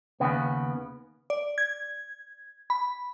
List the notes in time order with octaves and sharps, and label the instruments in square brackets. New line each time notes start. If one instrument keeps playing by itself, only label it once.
[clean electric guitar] D#2 C#3 B3
[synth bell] D5
G#6
B5